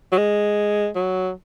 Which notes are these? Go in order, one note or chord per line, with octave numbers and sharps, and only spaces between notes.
F#3
G#3
F#3